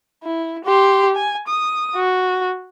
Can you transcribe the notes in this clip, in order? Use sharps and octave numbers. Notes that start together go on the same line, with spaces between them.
E4
G4 C6
G#5
D#6
F#4